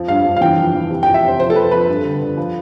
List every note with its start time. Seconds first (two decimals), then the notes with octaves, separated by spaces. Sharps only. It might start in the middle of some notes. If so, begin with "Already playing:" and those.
Already playing: F2 F3
0.08 G2 F5
0.26 G2
0.37 F5
0.41 E3 G5
0.58 F2
0.74 E3
0.90 C3
1.03 G5
1.07 F2
1.14 E5
1.23 C3 C5
1.39 F2 C5
1.50 A4
1.56 F2 B4
1.72 F2 B4
1.89 G2
2.05 D3
2.22 D3
2.37 F3